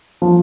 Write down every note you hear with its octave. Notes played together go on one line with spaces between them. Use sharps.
F3